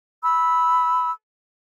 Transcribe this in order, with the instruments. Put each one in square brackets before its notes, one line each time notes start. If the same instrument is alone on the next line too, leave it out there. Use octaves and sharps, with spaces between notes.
[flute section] B5 E6